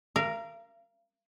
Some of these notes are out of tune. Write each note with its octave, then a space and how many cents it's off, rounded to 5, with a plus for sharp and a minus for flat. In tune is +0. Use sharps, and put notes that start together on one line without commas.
A#4 +0 F5 -40